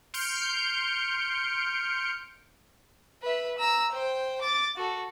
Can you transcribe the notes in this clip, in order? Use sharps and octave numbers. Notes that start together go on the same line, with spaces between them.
C6 F6 G6 C#7 D7
B4 E5
A#5 E6
C5 G5
D6 A6
F#4 A4